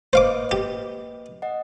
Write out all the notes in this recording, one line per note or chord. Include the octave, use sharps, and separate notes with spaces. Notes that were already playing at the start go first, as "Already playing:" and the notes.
A#3 B4 C5 D#5 F5 D6
G4
D#5 F#5